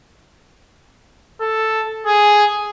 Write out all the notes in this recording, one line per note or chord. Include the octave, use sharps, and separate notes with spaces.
A4
G#4